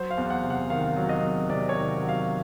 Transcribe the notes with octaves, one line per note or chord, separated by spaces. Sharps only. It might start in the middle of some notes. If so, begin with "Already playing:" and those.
Already playing: F#3 C5
F5
E2
F#5
C3
F#5
D#3 F5
F#3
D#5
E2
C3 D5
C#5
D#3
F#3
F5